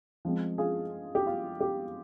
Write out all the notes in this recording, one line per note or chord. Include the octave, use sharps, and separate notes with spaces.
F3 G#3 C4
F4 G#4
G4
F4
G4